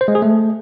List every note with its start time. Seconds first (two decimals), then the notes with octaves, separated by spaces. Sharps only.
0.01 C5
0.08 G#3
0.15 G#4
0.22 A3